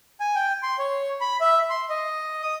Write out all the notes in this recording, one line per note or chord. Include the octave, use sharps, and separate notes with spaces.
G#5
G5
C6
C#5
B5
E5
C6
D#5
D#6